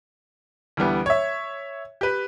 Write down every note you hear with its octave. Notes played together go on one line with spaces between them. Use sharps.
D2 E3 G3 B3
C#5 E5
G4 B4